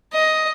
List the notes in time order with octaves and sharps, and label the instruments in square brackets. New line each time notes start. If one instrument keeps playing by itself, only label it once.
[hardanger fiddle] D#5